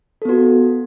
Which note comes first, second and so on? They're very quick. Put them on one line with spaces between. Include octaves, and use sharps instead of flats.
A4 B3 F#4